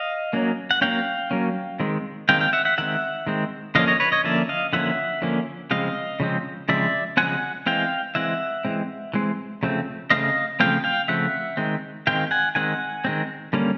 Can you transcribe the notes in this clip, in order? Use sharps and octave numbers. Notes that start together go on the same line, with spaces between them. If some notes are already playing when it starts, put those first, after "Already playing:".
Already playing: D#5 F5
F#3 A#3 C#4
F#5
F#3 A#3 C#4 F5 G5
F#3 A#3 C#4
D#3 G#3 C4
D#3 G#3 C4 F5 G5
F5 G5
E5 F#5
E5 F#5
D#3 G#3 C4 E5 F#5
D#3 G#3 C4
D3 F3 A#3 C#4 D#5 F5
C#5 D#5
B4 C#5
C#5 D#5
D3 F3 A#3 C#4 D5 E5
D#5 F5
D3 F3 A#3 C#4 E5 F#5
D3 F3 A#3 C#4
C#3 F3 G#3 C4 D#5 F5
C#3 F3 G#3 C4
C#3 F3 G#3 C4 D5 E5
C#3 F3 G#3 C4 F#5 G#5
E3 G#3 C4 F5 G5
E3 G#3 C4 E5 F#5
E3 G#3 C4
E3 G#3 C4
C#3 F3 A3 C4
C#3 F3 A3 C4 D#5 F5
C#3 F3 A3 C4 F5 G5
F5 G5
C#3 F3 A3 C4 E5 F#5
D#3 G#3 C4
D#3 G#3 C4 F5 G5
F#5 G#5
D#3 G#3 C4 F#5 G#5
D#3 G#3 C4
D3 G3 A#3 C#4